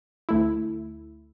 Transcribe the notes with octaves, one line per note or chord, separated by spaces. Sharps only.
D2 A3 E4